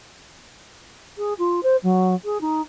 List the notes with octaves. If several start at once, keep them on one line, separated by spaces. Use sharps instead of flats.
G#4
F4
C5
F#3
G#4
D#4